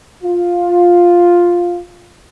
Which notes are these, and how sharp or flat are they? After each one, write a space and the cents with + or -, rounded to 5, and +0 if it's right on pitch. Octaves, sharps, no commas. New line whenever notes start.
F4 +5